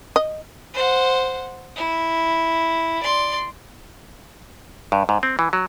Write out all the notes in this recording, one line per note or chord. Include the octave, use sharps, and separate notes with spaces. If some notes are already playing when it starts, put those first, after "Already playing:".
D#5
C5 F#5
E4
D5 C6
G2
G#2
C4
E3
F#3